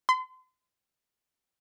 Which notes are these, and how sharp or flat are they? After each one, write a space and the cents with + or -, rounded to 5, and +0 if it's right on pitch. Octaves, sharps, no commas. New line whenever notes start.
C6 -35